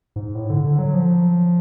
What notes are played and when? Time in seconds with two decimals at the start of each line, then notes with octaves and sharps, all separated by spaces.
0.16 G#2
0.35 A2
0.50 D3
0.64 D3
0.79 F#3
0.93 F3